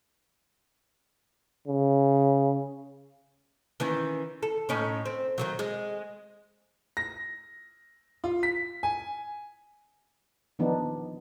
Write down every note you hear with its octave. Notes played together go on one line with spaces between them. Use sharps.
C#3
D#3 E3 C#4
A4
A2 C#4 D#4
C4
D#3 E3 F#3
G#3
A#6
F4
B6
G#5
D#3 F3 B3 D4 D#4